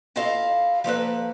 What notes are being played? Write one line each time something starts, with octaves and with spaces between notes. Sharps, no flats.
E4 F4 A4 D#5 F5
F3 A#3 A4 B4